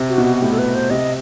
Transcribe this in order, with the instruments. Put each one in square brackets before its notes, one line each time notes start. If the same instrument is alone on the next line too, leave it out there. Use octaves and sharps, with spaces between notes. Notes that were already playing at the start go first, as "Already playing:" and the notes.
Already playing: [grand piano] C3
[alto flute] F#4
[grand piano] B2
[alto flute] F#4
[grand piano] A2 [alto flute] G4
[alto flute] A4
B4
C5
[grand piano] C3 [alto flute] D#5